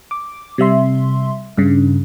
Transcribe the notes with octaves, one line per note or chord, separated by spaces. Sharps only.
D6
C3 G3 E5 C6
G2 C#3